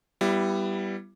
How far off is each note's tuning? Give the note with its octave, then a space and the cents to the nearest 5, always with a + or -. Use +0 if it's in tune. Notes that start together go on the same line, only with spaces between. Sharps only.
G3 -5 B3 +0 E4 +25